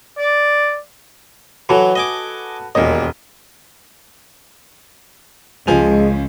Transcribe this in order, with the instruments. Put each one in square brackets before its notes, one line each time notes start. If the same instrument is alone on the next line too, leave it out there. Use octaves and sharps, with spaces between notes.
[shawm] D5
[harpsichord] E3 F#3 [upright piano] F#4 A4 B4
[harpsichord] D#5 G#5 D6
[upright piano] E1 D#5 [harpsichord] D#2 A#2
[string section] C#2 [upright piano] F3 G#5 F7 [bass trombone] G#3